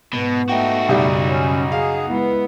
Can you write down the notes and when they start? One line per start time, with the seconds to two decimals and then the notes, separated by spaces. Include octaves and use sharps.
0.13 G#2 B2 B3
0.49 A3 D#4 F#4 G5
0.88 B1 F#2 C#3 G3
1.26 C#4
1.72 G#4 F5
2.08 G#3 B3 E4